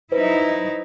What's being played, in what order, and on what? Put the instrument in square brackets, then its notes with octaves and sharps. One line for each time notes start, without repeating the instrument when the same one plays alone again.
[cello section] F#3 D#4 E4 [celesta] B4 C5